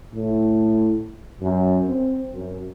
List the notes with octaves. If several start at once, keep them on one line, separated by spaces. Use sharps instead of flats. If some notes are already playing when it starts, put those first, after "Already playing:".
A2
F#2
C4
F#2